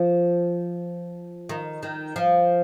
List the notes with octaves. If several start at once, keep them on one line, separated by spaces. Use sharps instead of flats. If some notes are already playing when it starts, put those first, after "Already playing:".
Already playing: F3
D#3
D#3
F3